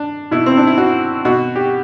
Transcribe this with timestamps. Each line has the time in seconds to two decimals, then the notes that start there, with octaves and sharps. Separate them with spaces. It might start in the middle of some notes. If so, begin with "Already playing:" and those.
Already playing: D4
0.31 B2 E4
0.46 C4
0.57 D4
0.67 E4
0.78 F#4
1.25 B2 F#4
1.56 G4